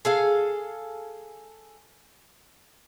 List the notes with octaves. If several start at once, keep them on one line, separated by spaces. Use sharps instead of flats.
G#4 A4 F5